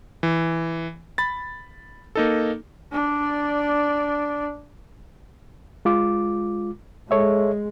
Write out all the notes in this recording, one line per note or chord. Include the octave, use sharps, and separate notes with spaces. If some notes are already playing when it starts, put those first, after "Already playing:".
E3
B5 A6
A#3 D#4 A4
D4 D5
G#3 F4 D6
G#3 A4 C#5 E5